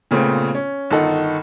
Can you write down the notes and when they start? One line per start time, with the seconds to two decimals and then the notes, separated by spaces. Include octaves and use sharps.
0.11 A#2 C#3 A3 B3 C4
0.55 C#4
0.91 G1 D#3 D#4 A4 F#5